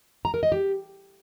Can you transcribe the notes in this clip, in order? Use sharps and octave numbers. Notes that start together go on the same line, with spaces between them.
A#5
A#4
D#5
G4